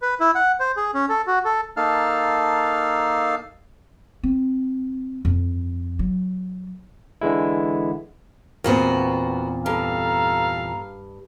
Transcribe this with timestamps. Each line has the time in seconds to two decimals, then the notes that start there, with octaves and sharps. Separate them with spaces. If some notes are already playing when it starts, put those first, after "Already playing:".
0.02 B4
0.20 E4
0.35 F#5
0.60 C5
0.77 G#4
0.94 C#4
1.09 A4
1.27 F#4
1.45 A4
1.77 A#3 D#4 A4 F5 A5 F6
4.23 C4
5.25 F2
5.99 F#3
7.21 D3 E3 G#3 E4
8.64 E2 A#2 B3 C4 F#4 A#4
9.66 G2 A4 F5 A#5